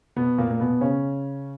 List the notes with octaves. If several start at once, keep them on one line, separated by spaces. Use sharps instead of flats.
B2 B3
A#2 A#3
A#3
B2 B3
C#3 C#4